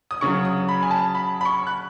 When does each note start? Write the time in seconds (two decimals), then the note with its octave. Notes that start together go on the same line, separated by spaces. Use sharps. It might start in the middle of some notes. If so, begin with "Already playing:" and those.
0.11 D#6
0.21 C#3 F#3 C#6
0.45 D#6
0.69 B5
0.83 G#5
0.91 A5
1.15 B5
1.41 B5
1.45 C#6
1.67 F#6